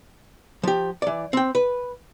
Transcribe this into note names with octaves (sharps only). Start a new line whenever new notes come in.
F3 G4
E3 D5
C4 G5
B4